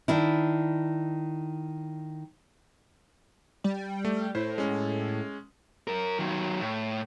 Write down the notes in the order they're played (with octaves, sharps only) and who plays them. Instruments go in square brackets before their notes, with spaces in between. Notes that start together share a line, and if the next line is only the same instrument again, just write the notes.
[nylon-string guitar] D#3 D4 E4
[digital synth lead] G3
[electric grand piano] A3
[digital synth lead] A2 [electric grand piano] E4 C5
[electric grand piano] G#3 C#4
[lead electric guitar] F#2 A#4
D#3 F#3
A2